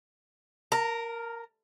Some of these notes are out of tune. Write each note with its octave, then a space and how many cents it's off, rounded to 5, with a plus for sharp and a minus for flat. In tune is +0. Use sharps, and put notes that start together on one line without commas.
A#4 +0 A5 +45